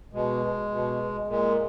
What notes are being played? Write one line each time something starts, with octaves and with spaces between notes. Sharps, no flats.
B2 G#3
B2
A#2 G#3